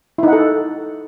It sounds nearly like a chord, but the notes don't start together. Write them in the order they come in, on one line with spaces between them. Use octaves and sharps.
E4 D#4 F#5 A4